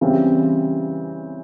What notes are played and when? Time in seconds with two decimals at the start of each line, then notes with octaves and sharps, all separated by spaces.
0.01 C#3 E3 G3 C4